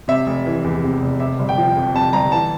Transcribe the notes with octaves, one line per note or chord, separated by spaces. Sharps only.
C3 E5
F1
E3
E2
C3
F1
C3 E5
G1
G5
F3
F2
C3 A5
G1 A#5
E3 A5